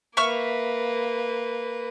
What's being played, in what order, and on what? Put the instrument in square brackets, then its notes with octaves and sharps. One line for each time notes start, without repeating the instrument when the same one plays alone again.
[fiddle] A#3 B4 [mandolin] E5 C#6 F6